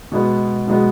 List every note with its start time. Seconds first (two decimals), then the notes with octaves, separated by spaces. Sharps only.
0.12 B2 G#3 B3
0.68 B2 G#3 B3